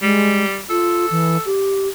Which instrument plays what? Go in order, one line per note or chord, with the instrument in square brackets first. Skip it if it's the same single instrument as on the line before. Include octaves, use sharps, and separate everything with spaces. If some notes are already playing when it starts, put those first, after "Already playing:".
[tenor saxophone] G3 [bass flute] G#3
[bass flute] F4 [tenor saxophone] A4
[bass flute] E3
G4